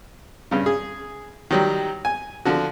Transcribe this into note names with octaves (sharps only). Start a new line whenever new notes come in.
G2 C#3
G#4
D#3 F#3 G3
G#5
D3 F3 F#4